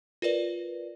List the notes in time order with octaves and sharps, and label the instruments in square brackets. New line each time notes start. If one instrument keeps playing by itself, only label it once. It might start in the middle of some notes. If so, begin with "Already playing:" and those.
[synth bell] F4 A#4 B4 D5